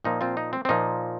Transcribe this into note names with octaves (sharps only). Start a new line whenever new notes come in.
A#2 F3 A#3 D#4
C4 F4
D#4
C4
C4
A#2 F3 A#3 D#4